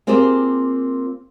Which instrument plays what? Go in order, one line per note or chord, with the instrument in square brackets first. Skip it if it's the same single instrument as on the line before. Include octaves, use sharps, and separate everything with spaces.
[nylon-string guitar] A#3 C4 F4 G4 G#4 C5